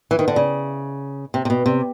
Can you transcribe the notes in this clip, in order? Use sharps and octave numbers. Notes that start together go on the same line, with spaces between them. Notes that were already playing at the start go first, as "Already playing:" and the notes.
E3
D#3
D3
C#3
C3
C3
B2
C3